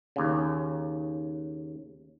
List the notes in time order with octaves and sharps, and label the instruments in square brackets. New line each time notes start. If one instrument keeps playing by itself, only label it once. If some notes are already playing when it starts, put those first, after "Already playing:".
[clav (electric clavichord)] D#2 C#3